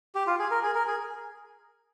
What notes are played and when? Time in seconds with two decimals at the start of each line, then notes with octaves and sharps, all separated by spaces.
0.15 G4
0.27 F4
0.39 G#4
0.51 A#4
0.63 G#4
0.75 A#4
0.87 G#4